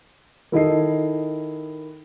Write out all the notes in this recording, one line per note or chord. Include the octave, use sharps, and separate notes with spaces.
D#3 E4 A4 D#5 C7